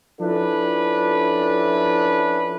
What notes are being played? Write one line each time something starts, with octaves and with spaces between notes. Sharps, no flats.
F3 C#4 D4 E4 A4 B4